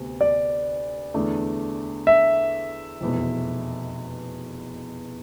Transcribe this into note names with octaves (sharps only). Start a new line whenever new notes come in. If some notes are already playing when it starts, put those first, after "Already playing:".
Already playing: D2 C3 B3
D5
E2 D3 A3
E5
F1 E2 B2